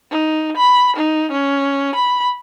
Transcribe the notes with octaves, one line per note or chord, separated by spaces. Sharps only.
D#4
B5
D#4
C#4
B5